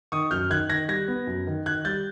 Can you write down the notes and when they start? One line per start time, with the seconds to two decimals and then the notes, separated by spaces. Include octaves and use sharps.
0.12 D#3 C#6 D#6
0.31 F#2 F6 G6
0.50 D#3 F#6 G#6
0.70 D#3 G#6 A#6
0.88 G3 G#6 A#6
1.08 B3
1.27 F#2
1.47 D#3
1.66 D#3 F#6 G#6
1.85 G3 G6 A6